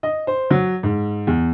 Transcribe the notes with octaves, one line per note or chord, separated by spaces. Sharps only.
D#5
C5
F#3
G#2
E2